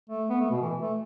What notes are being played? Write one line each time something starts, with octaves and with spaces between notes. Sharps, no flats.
A3
B3
A3
B2
E3
A3